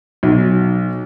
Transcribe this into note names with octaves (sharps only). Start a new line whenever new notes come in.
B1